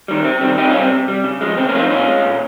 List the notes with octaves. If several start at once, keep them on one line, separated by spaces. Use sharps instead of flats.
D#3 G3
C3 C4
D#3 G3 C4
C3 D#4 G4
C#4 F4
G3
C4
C3
G3
C#3
F3 G#3
C#3 C4
A#3 C#4
F3 G#3 F4
C4 D#4
A#2 C#4 F4
G#3
A#2